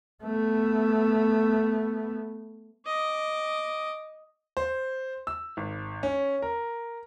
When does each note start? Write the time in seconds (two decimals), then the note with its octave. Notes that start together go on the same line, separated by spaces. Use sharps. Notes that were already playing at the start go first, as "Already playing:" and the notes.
0.24 A3 B3
2.86 D#5 D6
4.57 C5
5.27 E6
5.57 G#1
6.03 C#4
6.42 A#4